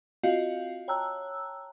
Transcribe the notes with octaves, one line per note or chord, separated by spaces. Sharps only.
C4 F4 F#4 D#5 F5
C#5 G5 A5 A#5 E6 F#6